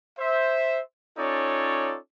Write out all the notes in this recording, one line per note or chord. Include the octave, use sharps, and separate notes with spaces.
C5 E5
C#4 D#4 F4 A4 C#5 D5